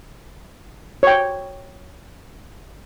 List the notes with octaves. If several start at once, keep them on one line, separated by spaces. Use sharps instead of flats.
C#5 G5